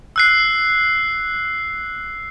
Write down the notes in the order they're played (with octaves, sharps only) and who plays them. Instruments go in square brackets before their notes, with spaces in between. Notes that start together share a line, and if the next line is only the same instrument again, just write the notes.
[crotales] E6 F#6 C7